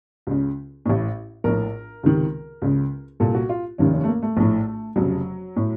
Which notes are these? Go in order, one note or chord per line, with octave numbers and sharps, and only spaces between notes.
C#2 C#3
A1 A2
A#1 A2 A#4
C#2 C3 D#3
C#2 C#3
C2 A#2 A4
F#4
F4
F1 D#2 D#3 C#4
C#4
A3
A#3
A3
A#1 A2
F1 F2 C#3 F#3
A2